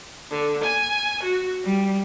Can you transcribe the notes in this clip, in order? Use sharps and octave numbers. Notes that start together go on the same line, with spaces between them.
D3
G#5
F#4
G3